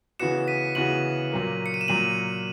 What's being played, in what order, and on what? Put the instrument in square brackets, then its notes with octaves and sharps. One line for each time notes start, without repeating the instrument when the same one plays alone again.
[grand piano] C#3 E3 B3 F#4 [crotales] C#7 E7
[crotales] B6 D#7
[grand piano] C#3 E3 B3 F#4 [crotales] D#7 F#7
[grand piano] A#2 F#3 A#3
[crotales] C#7
D#7
E7
[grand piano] A#2 F#3 A#3 [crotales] D#7 F#7